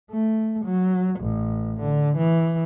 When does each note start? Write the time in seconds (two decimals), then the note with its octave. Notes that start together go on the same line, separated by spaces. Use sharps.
0.11 A3
0.65 F#3
1.20 A1
1.80 D3
2.17 E3